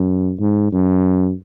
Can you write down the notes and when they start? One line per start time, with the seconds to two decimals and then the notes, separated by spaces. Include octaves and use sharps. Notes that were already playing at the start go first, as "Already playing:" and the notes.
Already playing: F#2
0.40 G#2
0.72 F#2